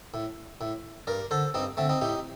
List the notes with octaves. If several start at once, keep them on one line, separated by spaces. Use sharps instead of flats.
A2
A2
G2 A#4 D5
D3 A4 C5
G2 C4 D#4
D3 A3 C4
C4 D#4
A2 D#4 G4